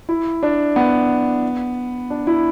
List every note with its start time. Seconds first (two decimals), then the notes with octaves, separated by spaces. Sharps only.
0.09 E4
0.43 D4
0.76 B3
2.10 D4
2.27 E4